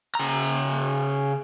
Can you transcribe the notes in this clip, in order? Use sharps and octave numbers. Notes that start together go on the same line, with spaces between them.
C#3 A#5